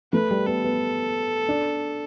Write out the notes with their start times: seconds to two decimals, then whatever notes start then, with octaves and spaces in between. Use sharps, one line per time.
0.13 A3 B4
0.31 G3
0.46 B3 A4
0.64 B3
1.49 D4